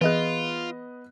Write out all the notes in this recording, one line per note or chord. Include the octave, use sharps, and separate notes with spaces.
E3 B3 F4 G#4 D#5 F#6